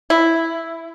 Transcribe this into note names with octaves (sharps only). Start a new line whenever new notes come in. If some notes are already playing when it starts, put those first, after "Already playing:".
E4